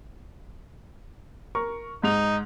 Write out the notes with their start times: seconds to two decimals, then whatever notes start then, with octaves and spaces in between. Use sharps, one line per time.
1.55 A#4 C#6
2.03 G#2 D#4 F7